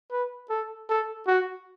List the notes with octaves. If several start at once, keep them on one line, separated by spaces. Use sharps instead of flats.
B4
A4
A4
F#4